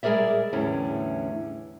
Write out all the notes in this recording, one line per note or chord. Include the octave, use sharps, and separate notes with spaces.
G3 G#3 G#4 A#4 D5 E5
E2 A2 D3 G3 C#4